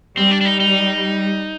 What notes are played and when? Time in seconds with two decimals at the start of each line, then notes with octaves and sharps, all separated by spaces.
0.17 G3 C4
0.31 D4
0.41 D4
0.45 D#4
0.60 D#4